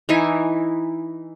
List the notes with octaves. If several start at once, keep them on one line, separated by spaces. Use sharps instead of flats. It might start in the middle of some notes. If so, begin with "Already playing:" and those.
E3 D#4 E4 G#5